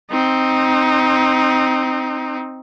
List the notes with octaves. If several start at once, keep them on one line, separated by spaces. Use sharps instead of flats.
C4 D#4